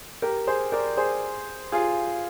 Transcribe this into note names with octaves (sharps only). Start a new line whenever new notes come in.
G4 A#4
G#4 C5
A#4 D5
G#4 C5
F4 G#4